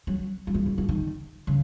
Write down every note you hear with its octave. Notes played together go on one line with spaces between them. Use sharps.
F#3
F#3
G#3
F#3
E3
D#3
C#3